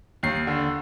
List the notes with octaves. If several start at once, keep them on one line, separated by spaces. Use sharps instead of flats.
D#2 C7
D3